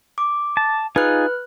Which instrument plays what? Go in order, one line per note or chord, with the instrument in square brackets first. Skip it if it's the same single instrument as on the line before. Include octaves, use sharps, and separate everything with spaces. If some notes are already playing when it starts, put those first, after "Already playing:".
[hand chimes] D6
[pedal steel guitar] A5
[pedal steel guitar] D#4 F4 G#4 [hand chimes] B4 F#6